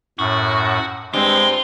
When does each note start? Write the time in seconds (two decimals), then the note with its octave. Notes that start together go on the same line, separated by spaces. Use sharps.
0.19 F#2 A2 F#4
1.14 G2 G#3 C4 F4